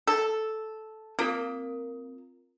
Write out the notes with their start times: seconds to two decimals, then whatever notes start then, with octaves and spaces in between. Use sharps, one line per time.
0.07 A4
1.19 A#3 C4 F4 A#4